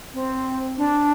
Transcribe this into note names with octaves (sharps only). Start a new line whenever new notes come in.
C4
D4